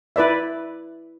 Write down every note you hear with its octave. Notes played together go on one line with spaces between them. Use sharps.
E4 B4 D5 E5